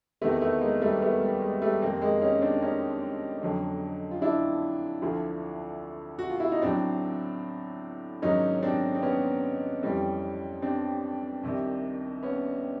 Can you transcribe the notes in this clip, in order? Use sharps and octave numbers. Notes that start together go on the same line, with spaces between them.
E2 C3 D#3 A3 B3
A3 B3
G#3 A#3
G3 A3
A3 B3
G3
G#3
G3 A3
F2 C3 D#3 A#3 C4
G#3 A#3
C#4 D#4
C4 D4
C#4 D#4
F2 D3 F#3
F4
D4 E4
D2 D3 F3
F#4
F4
E4
D#4
A2 F#3 C4 D4
G#2 D#3 F#3 C#4 D#4
C#4
C4 D4
C4
B3 C#4
F2 C3 E3 G3
C4 D4
C2 C3 D#3
B3 C#4